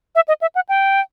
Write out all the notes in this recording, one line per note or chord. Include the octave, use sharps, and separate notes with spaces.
E5
D#5
E5
F#5
G5